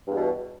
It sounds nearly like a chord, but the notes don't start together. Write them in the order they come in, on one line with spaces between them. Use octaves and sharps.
G2 E2 B2